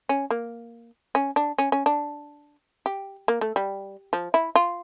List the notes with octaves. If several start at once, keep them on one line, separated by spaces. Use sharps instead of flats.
C#4
A#3
C#4
D4
C#4
C#4
D4
G4
A#3
A3
G3
F3
E4
F4